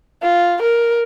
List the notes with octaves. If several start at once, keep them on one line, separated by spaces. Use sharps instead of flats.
F4
A#4